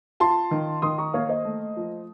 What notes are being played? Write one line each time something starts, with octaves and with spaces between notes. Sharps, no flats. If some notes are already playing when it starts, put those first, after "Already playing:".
F4 A5 C6
D#3
D#3 C6 D#6
A#5 C#6
A#3 C#5 F5
C5 D#5
A3
F3